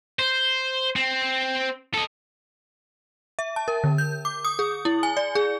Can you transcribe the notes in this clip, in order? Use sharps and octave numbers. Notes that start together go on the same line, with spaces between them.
C5
C4
A4 D#5
E5
A5
A#4
D3
G6
D6
D#6
G#4
E4
G#5
D5
G#4